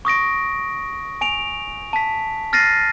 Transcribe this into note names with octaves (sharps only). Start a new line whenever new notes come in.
C#6 D#6 A#6 D7
G#5 D7 F7
A5 B6
F6 A6 A#6 C7 D#7